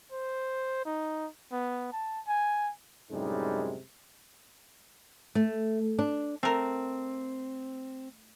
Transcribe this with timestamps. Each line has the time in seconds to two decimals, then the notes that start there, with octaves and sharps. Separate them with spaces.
0.12 C5
0.86 D#4
1.52 B3
1.93 A5
2.27 G#5
3.11 F#2 A2 C3 G3 G#3 D#4
5.35 A3
5.99 D4
6.43 A3 C4 A#4